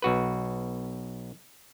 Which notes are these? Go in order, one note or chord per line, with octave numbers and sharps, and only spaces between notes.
B1 F#4 B4